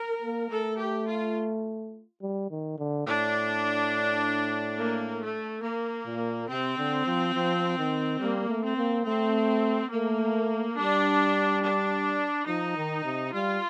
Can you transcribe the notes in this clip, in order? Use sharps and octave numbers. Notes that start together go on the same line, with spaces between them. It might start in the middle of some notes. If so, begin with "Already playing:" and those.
Already playing: A#4
A#3
A3 A4
G4
F4
G3
D#3
D3
A2 D4
A#3
A3
A#3
A#2
C3 C4
D3
F3
F3
D#3
G3 A#3
A3
C4
A#3
A3 C4
A3 A#3
G3 D4
D4
F3 D#4
D#3
C3
G3 F4